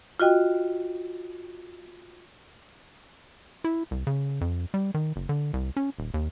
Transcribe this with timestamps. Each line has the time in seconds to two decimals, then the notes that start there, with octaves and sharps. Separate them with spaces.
0.20 F4 F#4 D#5 G5
3.64 E4
3.91 C2
4.07 C#3
4.41 F2
4.74 G3
4.94 D#3
5.16 F#1
5.29 D3
5.53 C2
5.77 C#4
5.98 D#1
6.14 D#2